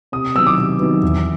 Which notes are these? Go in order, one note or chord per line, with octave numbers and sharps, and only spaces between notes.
C3 D#6
D#3 F#3 B3 E6
D6
C3
D#3 F#3 B3
E2